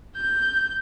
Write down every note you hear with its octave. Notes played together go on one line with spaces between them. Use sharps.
G6